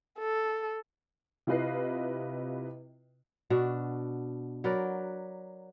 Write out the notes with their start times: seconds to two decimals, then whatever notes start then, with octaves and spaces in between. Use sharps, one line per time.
0.19 A4
1.47 C3 E4 F4 B4 D#5 C7
3.50 B2 D4 F#4
4.64 F#3 A#4 B4 D5